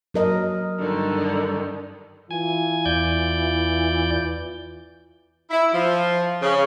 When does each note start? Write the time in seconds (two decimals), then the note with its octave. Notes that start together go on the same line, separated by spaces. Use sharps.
0.14 F#3 A#4 D#5
0.79 G2 D3 D#3
2.31 E3 F4 G#5
2.85 E2 D5 G6
5.50 E4
5.73 F3
6.42 C#3